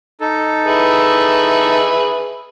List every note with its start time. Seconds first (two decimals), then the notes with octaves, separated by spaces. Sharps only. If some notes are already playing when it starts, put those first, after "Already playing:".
0.21 D#4 A4
0.65 G#4 B4 E5